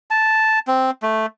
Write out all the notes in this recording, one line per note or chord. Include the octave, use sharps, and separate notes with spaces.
A5
C4
A3